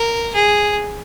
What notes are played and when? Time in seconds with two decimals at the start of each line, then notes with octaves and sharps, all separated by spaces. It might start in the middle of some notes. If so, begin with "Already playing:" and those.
Already playing: A#4
0.35 G#4